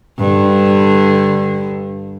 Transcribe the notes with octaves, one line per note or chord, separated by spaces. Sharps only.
G2 D3